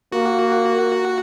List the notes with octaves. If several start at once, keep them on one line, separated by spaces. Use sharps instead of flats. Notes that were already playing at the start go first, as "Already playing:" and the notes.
A#3 F#4